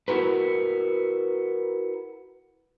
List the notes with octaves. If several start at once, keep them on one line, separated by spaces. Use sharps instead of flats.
E4 F#4 A#4 B4